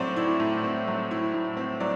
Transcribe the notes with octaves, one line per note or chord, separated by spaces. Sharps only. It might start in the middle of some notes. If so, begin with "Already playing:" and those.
Already playing: A2 F#3 C4 C5 D5
E4
A2
C4
F#3
E4
A2
C4
F#3 D5